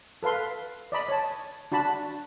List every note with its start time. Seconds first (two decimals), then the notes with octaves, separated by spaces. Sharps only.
0.23 A4 B4 F5 C6
0.92 D5 D#5 B5
1.08 C#5 A5
1.72 D4 F#4 A5 B5